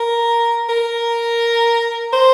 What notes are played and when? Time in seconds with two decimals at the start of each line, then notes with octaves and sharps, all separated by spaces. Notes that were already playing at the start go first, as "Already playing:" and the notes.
Already playing: A#4
0.69 A#4
2.13 C5